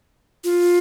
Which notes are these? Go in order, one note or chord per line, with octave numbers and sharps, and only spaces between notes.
F4